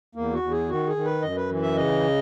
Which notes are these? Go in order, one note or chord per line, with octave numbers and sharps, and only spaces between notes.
E2 A#3
F#4
E2
G#4
D#3 F#4
G#4
D#3
B4
F#2 D#5
B4
E3
E5
C#3 D#5